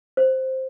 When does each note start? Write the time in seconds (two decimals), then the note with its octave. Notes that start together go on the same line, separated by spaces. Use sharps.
0.17 C5